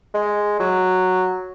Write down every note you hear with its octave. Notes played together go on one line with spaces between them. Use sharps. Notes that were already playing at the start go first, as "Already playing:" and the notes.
G#3
F#3